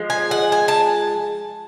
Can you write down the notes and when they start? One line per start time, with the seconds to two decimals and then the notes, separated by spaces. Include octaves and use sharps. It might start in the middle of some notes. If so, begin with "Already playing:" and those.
Already playing: F3 G#3
0.10 G#5
0.31 F#5
0.52 G#5
0.68 A5